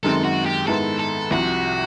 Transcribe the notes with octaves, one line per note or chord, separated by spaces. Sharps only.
F#2 D#3 G#3 C4 A4
F#4
G4
G#2 D#3 G#3 B3 E4 A4
A4
C2 C3 F3 F#4